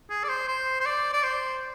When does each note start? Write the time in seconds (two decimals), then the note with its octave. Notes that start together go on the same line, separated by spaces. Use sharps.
0.10 G#4
0.24 D5
0.29 C5
0.48 C5
0.81 C5
0.86 D5
1.13 D5
1.23 C5